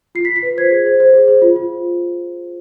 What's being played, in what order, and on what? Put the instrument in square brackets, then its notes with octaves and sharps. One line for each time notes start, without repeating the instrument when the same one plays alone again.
[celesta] F4 C7
B6
F4
B6
B4
C5 G#6
G#4
C5
C5
G#4
C5
F4
F4